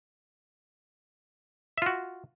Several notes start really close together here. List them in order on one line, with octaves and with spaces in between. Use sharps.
E5 F4 F#4